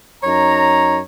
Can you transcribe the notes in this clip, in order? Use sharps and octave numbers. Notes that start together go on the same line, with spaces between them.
F#2 D#4 C#5 A#5